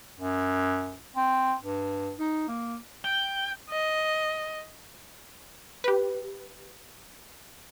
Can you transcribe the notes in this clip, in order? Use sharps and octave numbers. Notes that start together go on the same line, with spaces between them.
F#2
C4
G2
D#4
A#3
G5
D#5
G4 B4